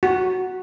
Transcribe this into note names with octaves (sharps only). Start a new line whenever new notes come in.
F#4